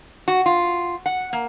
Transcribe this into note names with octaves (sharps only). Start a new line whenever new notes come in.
F#4
F4
F#5
A#3